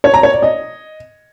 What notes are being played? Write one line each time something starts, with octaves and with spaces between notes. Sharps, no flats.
C#5
A#5
C#5
D5
D#5